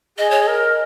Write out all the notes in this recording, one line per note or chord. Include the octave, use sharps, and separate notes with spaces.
G#4 D#5
C#5
D#5
A#4